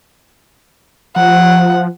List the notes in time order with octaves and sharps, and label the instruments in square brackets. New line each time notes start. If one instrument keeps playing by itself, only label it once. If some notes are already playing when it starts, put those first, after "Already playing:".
[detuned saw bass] F3 [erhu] F#5